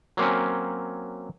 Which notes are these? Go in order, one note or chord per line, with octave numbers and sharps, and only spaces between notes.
F#3 A#3 C4 C#4